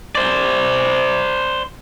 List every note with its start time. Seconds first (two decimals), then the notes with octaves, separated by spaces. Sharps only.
0.15 C5 D5